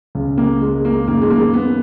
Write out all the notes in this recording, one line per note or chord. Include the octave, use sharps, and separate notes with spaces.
C#2 C#3
A#3
G#3
A#3
F#2 D#3 A#3
G#3
A#3
B3